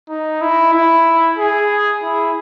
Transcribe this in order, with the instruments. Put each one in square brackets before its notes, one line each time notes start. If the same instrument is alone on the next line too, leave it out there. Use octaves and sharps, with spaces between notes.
[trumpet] D#4
E4
E4
G#4
E4